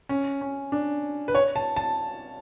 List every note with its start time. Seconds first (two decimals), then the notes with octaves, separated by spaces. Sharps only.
0.09 C#4
0.41 C#4
0.72 D4
1.28 B4
1.35 C#5
1.56 A5
1.76 A5